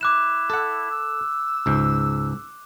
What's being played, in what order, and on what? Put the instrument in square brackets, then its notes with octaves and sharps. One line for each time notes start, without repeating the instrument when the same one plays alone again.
[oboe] E4 [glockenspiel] D6 F#6 E7
[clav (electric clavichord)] A4 F#5
[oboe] E6
[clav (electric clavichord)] C#2 G#2